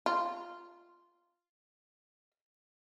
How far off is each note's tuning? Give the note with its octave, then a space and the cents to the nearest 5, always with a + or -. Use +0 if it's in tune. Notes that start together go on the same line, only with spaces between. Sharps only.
F4 -5